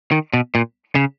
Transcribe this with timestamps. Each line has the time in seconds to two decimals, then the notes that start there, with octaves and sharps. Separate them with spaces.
0.12 D#3
0.33 B2
0.55 A#2
0.95 C#3